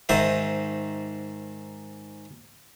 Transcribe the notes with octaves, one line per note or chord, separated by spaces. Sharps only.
G#2 D#3 C5 E5